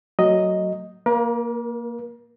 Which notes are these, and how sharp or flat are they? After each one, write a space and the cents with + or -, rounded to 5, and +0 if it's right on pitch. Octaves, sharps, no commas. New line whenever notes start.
F#3 +5 A3 +40 D#5 +0
A#3 +0 A#4 +40